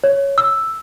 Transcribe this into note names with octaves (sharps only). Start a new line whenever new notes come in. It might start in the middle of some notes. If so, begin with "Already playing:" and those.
C#5
E6